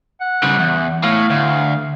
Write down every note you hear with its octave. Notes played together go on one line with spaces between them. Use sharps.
F#5
C#3 G3
E2
A2 F5
D2